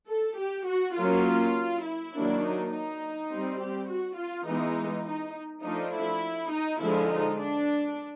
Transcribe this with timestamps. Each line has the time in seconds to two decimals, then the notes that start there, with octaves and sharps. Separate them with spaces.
0.09 A4
0.38 G4
0.67 F#4
0.97 F#3 A#3 C#4 F4
1.85 E4
2.13 D#3 F#3 A#3 D4
2.43 D#4
2.72 D#4
3.31 G3 C4
3.60 G4
3.89 F#4
4.18 F4
4.47 E3 G#3 B3 D#4
5.05 D#4
5.64 F3 A3 D4 D#4
5.93 E4
6.52 D#4
6.80 D3 F3 G#3 E4
7.10 D#4
7.39 D4